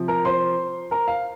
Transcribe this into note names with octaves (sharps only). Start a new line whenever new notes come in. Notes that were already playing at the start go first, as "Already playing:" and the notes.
Already playing: C3 F3
A#4 A#5
C5 C6
A#4 A#5
F5